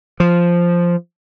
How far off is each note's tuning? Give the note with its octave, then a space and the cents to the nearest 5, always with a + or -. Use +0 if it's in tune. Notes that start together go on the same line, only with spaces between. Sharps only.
F3 -5